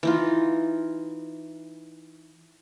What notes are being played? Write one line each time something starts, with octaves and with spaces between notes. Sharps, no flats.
E3 D#4 F4